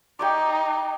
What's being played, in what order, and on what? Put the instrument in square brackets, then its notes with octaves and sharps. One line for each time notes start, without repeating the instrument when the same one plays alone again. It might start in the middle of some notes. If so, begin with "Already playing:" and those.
[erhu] D#4 [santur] G4 C#5 D5